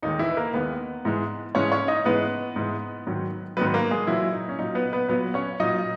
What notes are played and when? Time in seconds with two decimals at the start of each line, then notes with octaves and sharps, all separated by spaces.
0.03 D#2 D#3 G#3 D#4
0.19 E3 E4
0.31 B4
0.37 A#3 A#4
0.54 D#2 D#3 G#3 B3 B4
1.05 G#2 E3 G#3
1.55 G#2 E3 G#3 C#4 C#5
1.72 C#4 C#5
1.88 D#4 D#5
2.05 G#2 E3 G#3 B3 B4
2.56 G#2 E3 G#3
3.07 G#2 D#3 F#3
3.57 G#2 D#3 F#3 B3 B4
3.67 B4
3.74 A#3 A#4
3.91 G#3 G#4
4.07 A#2 E3 F#3 E4
4.33 D#4
4.49 C#4
4.59 A#2 F#3 D#4
4.75 B3 B4
4.93 B3 B4
5.09 A#2 F#3 B3 B4
5.34 C#4 C#5
5.60 A#2 F#3 D#4 D#5